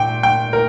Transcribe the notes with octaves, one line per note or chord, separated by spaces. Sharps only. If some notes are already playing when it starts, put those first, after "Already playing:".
Already playing: A#2 G5
G5
A#4